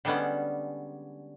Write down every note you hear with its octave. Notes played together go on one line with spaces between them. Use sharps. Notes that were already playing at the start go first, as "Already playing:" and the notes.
D3 G3 G#3 B3 C#4